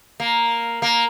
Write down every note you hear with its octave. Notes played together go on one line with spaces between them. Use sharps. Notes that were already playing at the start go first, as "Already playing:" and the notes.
A#3
A#3